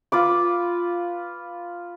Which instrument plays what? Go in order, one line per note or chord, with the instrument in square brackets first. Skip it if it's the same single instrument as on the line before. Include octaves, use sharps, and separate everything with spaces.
[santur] F4 B4 D6